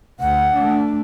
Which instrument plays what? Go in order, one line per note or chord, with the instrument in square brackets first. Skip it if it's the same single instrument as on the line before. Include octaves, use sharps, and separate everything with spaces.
[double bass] D2 [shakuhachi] F#5
[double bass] A3 D4